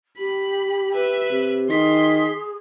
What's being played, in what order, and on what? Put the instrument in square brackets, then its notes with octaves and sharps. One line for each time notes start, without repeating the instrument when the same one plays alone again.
[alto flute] G4 [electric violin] B5
[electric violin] B4 E5
[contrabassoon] C3
[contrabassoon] D#3 [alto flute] G#4 [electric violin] C6 B6